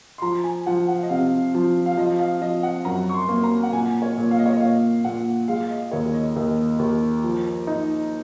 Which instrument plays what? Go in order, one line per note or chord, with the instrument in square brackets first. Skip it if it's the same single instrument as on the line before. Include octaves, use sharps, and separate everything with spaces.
[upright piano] C6
[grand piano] F3 [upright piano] A#5
[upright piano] G#5
[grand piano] F3 [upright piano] F#5
[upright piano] F#5
F5
D#5
[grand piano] C3 [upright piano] F5
[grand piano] F3
[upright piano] F5
[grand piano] F3 [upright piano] D#5
[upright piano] F5
[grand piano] F3 [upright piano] D#5
[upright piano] F#5
[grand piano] F#2 [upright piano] A#5
[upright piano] C#6
C6
[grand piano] A#3
[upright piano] A#5
F#5
[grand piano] A#2 [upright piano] G#5
[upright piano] C#5
[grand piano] A#2
[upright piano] F5
D#5
C#5
D#5
[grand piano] A#2 [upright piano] F5
[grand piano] A#2 [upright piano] F#5
[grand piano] G#3 [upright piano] F5
[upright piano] D#5
[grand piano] D#2 [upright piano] C#5
[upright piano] D#5
[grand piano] D#2
D#2
F3
D#4